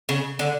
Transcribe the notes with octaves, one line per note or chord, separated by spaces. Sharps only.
C#3
D3